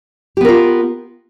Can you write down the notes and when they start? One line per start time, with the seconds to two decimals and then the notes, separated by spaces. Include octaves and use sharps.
0.37 G4
0.41 B3
0.45 A#4
0.49 F4